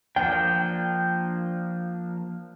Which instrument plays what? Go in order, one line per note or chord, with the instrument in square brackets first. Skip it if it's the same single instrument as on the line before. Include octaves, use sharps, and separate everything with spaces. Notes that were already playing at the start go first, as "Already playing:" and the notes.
[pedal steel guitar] F3 A#3 D4 [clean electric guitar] G5